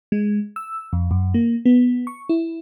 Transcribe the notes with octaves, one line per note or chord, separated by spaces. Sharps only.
G#3
E6
F2
F#2
A#3
B3
C#6
E4